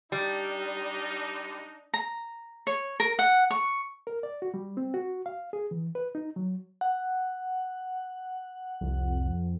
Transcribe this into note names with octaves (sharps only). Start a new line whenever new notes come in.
G3 D4 D#4
A#5
C#5
A#4
F#5
C#6
A#4
D5
F#4
G3
C4
F#4
F5
G#4
E3
B4
D#4
F#3
F#5
C2 F2